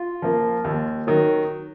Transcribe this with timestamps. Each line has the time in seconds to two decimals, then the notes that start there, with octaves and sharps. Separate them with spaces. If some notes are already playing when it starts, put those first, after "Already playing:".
Already playing: F4
0.22 F3 A#3
0.64 D#2
1.07 D#3 F#3